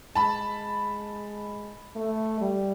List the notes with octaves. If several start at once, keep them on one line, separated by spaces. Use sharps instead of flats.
G#3 A5 B5
A3
G3